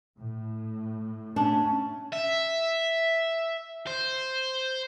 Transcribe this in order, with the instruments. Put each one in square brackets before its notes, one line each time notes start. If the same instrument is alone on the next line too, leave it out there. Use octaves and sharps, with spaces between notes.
[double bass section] A2
[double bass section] A3 C#4 [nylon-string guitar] D4
[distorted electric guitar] E5
C5